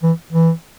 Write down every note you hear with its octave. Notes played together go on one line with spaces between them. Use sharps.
E3
E3